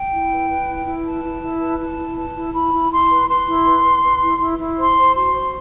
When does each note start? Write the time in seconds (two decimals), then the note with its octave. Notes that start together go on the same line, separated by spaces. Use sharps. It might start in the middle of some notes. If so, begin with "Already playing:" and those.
Already playing: G5
0.12 E4
0.31 B4
0.50 B4
0.68 E4
0.86 E4
1.05 B4 A5
1.23 E4
1.42 E4
1.60 B4
1.79 E4 A5
1.99 E4
2.17 B4 A5
2.35 E4
2.54 E4 B5
2.73 E4
2.91 E4 C6
3.10 B4
3.28 B4 C6
3.47 E4
3.66 B4
3.84 B4
4.03 B4
4.22 E4
4.40 E4
4.58 E4
4.78 C5 C6
4.96 C5
5.14 F#4 C6
5.33 C5